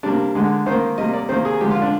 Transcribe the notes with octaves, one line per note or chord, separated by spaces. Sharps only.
C3 G3 A#3 D4
D3 G#3
D#3 A#3 C5
C3 G3 A#3 D#5
D5
C3 D#3 A#3 C5
G#4
D3 F3 G#3 G4
F4
D4